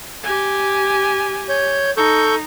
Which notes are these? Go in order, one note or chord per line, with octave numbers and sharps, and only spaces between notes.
G4 G#5
C#5 G6
D#4 A4 C#6 G6